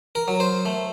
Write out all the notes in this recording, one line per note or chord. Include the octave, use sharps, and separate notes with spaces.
A#4
F#3
C5
A3